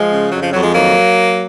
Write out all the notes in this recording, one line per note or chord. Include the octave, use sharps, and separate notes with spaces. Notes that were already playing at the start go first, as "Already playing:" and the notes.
Already playing: F3 G#3
C#3
F2 F#3
F3
F2 F#3
F3 G#3
D#3 F#3 A#3